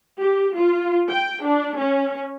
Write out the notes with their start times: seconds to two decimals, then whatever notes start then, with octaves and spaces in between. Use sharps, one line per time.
0.19 G4
0.56 F4
1.10 G5
1.45 D4
1.78 C#4